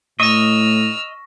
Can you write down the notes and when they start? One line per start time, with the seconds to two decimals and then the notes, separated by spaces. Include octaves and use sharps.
0.20 A2 D#5 C#6 E6 F6 A#6